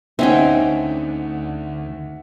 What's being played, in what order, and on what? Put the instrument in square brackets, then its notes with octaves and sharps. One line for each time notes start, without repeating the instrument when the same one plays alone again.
[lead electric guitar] D2 [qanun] C4 C#4 G5 [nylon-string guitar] D#4 [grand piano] E5 F#5